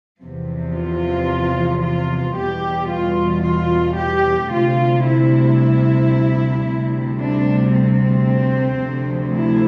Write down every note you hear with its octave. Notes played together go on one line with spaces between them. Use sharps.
E2 C3 F3
F4
F4
E2 B2 G3 G4
F4
F4
G4
D2 C3 G3 F4
E4
D2 C3 G3
D4
C4
D2 C3 F3
E4